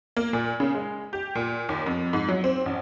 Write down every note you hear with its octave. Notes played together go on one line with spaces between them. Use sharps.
A#3
A#2
C#3
G#3
G4
A#2
D#2
F2
G#2
F#3
C4
A1